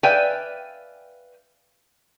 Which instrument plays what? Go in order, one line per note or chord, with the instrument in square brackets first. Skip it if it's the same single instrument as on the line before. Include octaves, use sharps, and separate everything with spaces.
[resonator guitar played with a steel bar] B4 D5 E5 F5 G5 G#5